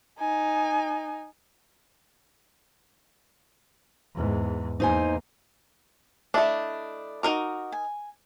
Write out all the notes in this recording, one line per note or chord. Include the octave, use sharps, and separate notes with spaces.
D#4 G#5
E2 G#2
E2 A#3 D#4 C5 G#5
A3 D4 E4 D5 D#5
D#4 F#4 A#4 A#5 D6
G#5